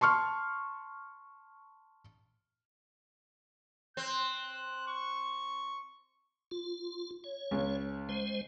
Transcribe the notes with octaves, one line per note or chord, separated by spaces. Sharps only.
A5 C6 C#6 F6
C4 F#6
C#6
F4
C#5
C#2 C#4 G#4
G#3 C5